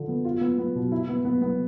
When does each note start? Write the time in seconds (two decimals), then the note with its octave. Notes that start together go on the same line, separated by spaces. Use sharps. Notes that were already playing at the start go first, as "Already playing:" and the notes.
Already playing: D3 F3
0.08 B3
0.25 F4
0.41 B3
0.58 B3
0.75 B2
0.92 E4
1.09 B3
1.25 B3
1.42 B3